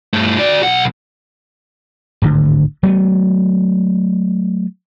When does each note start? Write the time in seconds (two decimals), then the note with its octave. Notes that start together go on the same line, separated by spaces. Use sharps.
0.14 G2 A3
0.38 F#4 D5
0.63 B1 F#5
2.22 D1 G#1 D2 D3
2.83 F#3 G#3 A3 B3